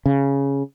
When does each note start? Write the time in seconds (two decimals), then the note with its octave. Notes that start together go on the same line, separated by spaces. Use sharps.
0.06 C#3